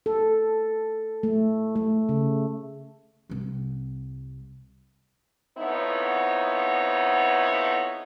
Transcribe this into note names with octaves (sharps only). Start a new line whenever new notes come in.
A4
A3
A3
C#3
C2 C4
F2 B3 D#4 E4 C#5